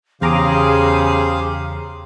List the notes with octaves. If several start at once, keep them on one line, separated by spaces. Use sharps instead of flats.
E2 C#3 G4 G#4 C5 F5 A#5 D6